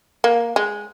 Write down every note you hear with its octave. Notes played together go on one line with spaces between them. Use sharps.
A#3
G#3